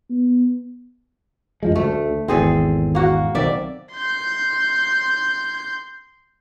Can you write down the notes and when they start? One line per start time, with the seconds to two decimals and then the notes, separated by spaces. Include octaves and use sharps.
0.10 B3
1.63 F#2 F3 G#3
1.76 D2 A3
2.28 G#1 E2 C4 G#4 A4
2.95 A#3 F#4
3.35 B1 D#3 C4 D5 E5
3.93 C6 G6